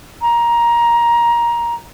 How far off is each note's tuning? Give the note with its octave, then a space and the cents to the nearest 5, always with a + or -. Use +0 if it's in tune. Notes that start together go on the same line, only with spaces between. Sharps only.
A#5 +15